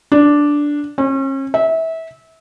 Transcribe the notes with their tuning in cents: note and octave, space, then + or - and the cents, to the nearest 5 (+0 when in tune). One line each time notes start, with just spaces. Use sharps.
D4 -5
C#4 -40
E5 -25